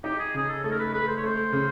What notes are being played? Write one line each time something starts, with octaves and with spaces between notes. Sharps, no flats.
D#4 G4
G#4
C#3 G#4
A4
A3 A4
A#4
B4
A3 B4
C5
C#5
A3 C5
C#3